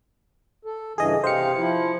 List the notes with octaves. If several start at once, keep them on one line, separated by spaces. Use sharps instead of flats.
A4
G2 C#3 E3 G#4 D#5
C3 G4 C5 F5 C#7
F3 E4